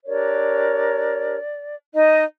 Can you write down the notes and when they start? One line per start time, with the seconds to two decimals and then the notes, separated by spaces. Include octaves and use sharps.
0.05 D4 G4 A#4 C#5 D5
1.94 D#4 D#5